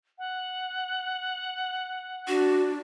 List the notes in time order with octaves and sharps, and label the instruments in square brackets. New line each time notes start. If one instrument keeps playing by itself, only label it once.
[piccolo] F#5
[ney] D4 [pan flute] F#4